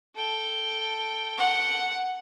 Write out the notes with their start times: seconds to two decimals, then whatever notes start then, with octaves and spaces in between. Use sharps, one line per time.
0.15 A4 G5
1.38 F#5